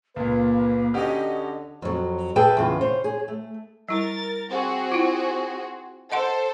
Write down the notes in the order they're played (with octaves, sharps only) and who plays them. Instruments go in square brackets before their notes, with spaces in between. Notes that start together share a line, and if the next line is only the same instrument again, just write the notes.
[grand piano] C#2 A#2 [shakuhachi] A#3 [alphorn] B4
[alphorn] D3 [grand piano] C#4 F#4 G4 [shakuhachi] D#5
[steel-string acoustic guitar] F2 F#3
G#4 B4 E5 G5 A5
E2 C#3 F4
C5 C#5
G#4
A3
[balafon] G3 E4 [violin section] A#4 A6
[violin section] C4 F#4 G#4
[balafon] E4 F4
[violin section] A4 C5 [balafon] D#5 F#5 C6